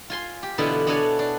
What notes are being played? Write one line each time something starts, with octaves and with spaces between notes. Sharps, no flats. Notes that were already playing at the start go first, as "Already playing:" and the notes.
F4 G#5 C6
G4
B2 D3 E3 B3 E4 F4
B3 D4 F#4 A4 C#5 G#5
D4